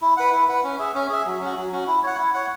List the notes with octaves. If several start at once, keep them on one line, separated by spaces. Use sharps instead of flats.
E4
B4 F#5
E4
B4 F#5
C#4
G#4 E5
C#4
G#4 E5
F#3
C#4 F#4
F#3
C#4 F#4
E4
C#5 F#5
E4
C#5 F#5